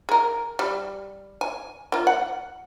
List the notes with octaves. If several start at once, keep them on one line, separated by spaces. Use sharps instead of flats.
G#4 A#4
G3
G#5
A#3 F4
F#5